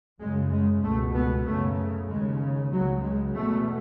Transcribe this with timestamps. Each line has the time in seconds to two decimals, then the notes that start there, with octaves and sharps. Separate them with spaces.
0.20 F#2 C#3 G#3
0.51 G#3
0.83 C#2 B2 A3
1.14 B3
1.45 F#2 C#3 A3
2.09 D#2 C#3 G#3
2.72 C#2 C#3 F#3
3.03 G#3
3.34 E2 B2 A3